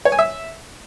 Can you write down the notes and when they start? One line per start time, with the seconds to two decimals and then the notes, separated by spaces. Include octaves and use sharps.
0.05 C#5
0.12 G#5
0.19 E5